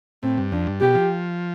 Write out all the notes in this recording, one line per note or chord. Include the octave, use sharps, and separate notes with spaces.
A2 C4
G2
F2 D4
G2
B2 G4
F3